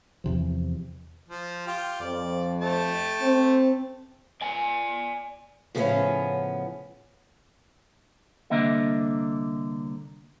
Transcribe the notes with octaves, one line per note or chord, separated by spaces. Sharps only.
E2 C3 F3
F3
F4 G4
F2 D5
A3 G4 A5
C4
D5 G#5
A2 C#3 F3 A3 B3 C#4
C2 D3 A#3 D#5 E5